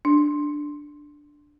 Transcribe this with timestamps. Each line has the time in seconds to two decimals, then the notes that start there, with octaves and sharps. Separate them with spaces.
0.05 D4